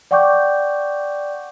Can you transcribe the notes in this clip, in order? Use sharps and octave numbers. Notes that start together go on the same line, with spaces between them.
D5 F#5 G5 C#6 D6 G6